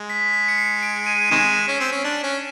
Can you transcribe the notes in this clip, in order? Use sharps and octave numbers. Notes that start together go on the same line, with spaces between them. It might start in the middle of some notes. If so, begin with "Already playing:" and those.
Already playing: G#3
B6
B6
C#7
C7
D7
D#7
D#7
C3 D#3 G#3 E7
C#4
C4
C#4
D4
C#4